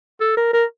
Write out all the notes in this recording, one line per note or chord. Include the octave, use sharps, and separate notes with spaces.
A4
A#4
A#4